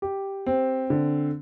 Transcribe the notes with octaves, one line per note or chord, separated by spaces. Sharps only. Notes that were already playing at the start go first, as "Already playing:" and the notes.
G4
C4
D3